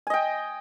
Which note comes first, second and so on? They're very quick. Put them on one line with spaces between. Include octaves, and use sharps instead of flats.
G#5 D#5 G5